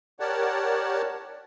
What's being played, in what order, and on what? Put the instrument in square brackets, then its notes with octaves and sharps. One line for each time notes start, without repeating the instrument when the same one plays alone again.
[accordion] G4 A#4 C#5 D5 F#5 A5